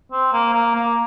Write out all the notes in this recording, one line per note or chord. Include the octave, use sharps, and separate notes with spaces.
C4
A#3
A#3
A#3